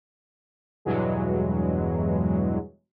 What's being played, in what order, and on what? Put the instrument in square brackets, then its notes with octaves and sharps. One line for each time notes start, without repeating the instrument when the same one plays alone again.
[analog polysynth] E2 G2 B2 E3 F#3 G#3